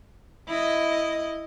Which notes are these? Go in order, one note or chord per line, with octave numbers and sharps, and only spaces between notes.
E4 D#5